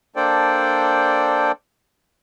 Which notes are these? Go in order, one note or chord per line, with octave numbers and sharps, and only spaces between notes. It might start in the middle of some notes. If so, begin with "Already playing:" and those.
A#3 D4 A4 C5 D5 G5